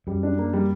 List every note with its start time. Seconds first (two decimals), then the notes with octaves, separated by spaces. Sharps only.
0.07 F#2 G3
0.23 D4
0.38 A#3
0.53 G3